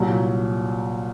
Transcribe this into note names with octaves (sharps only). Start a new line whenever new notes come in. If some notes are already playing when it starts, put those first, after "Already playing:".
Already playing: C2 A#2 F#3